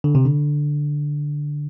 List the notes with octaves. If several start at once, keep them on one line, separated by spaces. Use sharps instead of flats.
D3
C3
D3